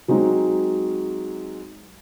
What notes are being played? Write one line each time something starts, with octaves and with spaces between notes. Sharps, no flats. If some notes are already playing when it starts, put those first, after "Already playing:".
F#3 G#3 C4 D#4